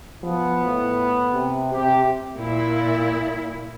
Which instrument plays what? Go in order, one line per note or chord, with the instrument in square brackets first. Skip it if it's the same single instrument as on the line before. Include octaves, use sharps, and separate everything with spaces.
[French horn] F3 [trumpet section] B3
[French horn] A2
C3
[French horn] C3 [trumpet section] G4
[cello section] A#2 E4